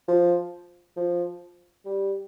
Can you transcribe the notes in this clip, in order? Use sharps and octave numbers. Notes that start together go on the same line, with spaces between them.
F3
F3
G3